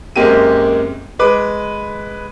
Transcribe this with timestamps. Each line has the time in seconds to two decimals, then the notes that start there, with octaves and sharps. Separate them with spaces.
0.16 F#2 G#3 A#3 C4 G4 D#7
1.19 G#3 B4 D6